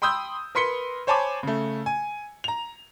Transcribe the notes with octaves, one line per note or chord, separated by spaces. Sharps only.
G5 B5 C6 D#6 E6 G6
A#4 B4 C6 B6 C#7 G7
C5 C#5 G#5 A5 B5 D6
C#3 A3
G#5
A#5 F7